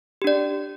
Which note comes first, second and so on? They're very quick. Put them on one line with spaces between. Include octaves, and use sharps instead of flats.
G4 D4 D5